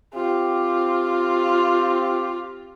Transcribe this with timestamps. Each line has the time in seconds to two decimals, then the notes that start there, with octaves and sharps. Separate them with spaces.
0.15 C4 F4 G4